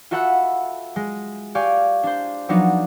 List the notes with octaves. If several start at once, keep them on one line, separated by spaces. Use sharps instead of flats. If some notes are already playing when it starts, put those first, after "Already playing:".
F4 F#4 A4 E5 F#5 B5
G#3
G4 D5 F5 G#5 C#6
D4 C5
F3 F#3 B3 D4 D#4